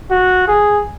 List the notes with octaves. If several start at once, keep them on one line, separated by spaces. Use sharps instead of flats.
F#4
G#4